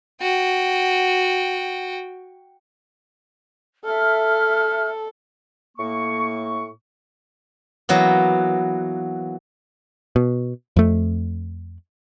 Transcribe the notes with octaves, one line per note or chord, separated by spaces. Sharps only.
F#4 G5
A4 E5 F6
A2 A#3 C#6
E3 F#3 A#3 B3
B2
F2 A3